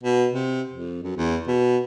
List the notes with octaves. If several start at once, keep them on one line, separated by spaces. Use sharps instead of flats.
B2
C3
F2
F#2
E2
B2